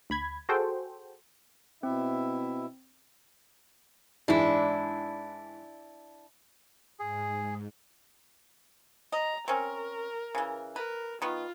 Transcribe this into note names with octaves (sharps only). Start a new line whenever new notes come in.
D2 B5 G#6
F#4 G#4 A4 C5 G5
B2 C4 E4 E5
G#2 E3 G#3 D4 E4
G#2 G#4
D#5 A#5
C4 C#4 A#4
C#3 E3
A#4 B4
D#3 B3 F4